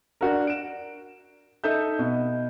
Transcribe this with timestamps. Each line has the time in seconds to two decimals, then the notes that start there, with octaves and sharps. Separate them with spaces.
0.21 D4 F#4 A#4
0.47 D7 E7
1.64 D#4 A4 E5 G6
1.99 B2